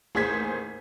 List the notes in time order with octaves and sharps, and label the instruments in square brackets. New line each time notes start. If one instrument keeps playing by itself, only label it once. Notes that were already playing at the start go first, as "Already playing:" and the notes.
[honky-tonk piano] A1 D#2 G#4 C5 G#6 B6